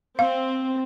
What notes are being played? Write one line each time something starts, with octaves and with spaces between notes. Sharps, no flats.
C4 F5